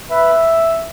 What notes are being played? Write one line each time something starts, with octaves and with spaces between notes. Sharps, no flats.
B4 E5